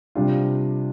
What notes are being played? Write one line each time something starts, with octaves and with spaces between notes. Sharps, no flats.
C3 G3 D4 F4